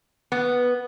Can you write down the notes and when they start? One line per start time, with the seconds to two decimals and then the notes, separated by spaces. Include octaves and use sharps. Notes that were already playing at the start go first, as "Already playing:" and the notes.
0.32 B3